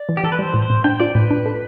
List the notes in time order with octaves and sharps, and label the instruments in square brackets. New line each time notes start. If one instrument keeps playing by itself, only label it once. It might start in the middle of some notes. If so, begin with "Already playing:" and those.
Already playing: [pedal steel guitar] D5
[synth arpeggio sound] E3
[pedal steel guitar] G4
[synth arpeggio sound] E3 [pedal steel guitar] A4
[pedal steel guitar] B4
[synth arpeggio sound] G3 [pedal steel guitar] C5
[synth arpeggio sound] A2
[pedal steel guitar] C5
[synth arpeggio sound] A2
[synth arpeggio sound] D4 [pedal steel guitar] G5
[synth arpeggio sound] F4 [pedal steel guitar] D5
[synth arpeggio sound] A2 [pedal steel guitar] B4
[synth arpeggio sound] D4
A4